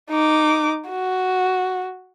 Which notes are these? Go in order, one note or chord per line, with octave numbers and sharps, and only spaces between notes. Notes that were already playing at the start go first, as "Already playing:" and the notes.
D#4 D6
F#4